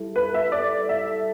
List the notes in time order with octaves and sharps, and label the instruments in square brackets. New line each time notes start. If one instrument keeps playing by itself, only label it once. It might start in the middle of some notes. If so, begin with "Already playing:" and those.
Already playing: [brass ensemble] G3 E4 A4
[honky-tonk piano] B4
E5
D5
E5